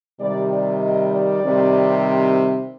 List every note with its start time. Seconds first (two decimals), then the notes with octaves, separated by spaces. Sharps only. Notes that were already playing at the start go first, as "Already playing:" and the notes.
0.21 C3 D#3 G3 D5
0.51 D5
0.82 D#5
1.12 D5
1.43 C3 D#3 G3 C4